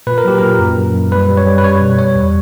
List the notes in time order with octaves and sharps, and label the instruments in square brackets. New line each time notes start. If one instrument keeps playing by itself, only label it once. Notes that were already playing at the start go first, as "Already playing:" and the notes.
[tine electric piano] A#2 B4
A#4
F#3 G4
A#2 A#4
F#2
F#2
F#2
G3 B4
G3
C#5
G3
B4
G3 C#5
B2
G3 C#5
E2